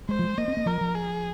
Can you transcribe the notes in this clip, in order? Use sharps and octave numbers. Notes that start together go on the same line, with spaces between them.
G#3 C5
F3
G#3
A#3 D#5
C4
A#3
F3 A#4
F3
G#4